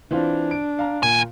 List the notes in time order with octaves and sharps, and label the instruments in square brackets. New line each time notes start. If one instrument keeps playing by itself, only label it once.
[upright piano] E3 C4 F4 [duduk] D4
[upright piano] D7
F5 A#5
[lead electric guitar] D#2 G#5 [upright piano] A#2